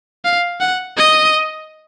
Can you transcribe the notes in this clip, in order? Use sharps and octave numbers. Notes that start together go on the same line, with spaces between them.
F5
F#5
D#5